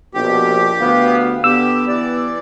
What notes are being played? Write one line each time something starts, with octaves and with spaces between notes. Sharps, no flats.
A#1 B2 G4
D2 B3 F5
D3 B3 G4 E6
E3 D5